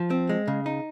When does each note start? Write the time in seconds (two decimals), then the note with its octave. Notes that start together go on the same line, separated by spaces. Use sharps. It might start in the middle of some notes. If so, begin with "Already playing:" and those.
Already playing: F3
0.10 C4
0.29 G#3
0.47 C#3
0.66 D#4